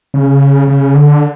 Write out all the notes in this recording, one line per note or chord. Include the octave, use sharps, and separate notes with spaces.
C#3
C#3
D3